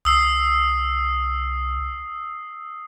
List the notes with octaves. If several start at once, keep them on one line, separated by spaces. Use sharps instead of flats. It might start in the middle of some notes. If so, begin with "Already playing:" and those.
C2 D#6 E6 C7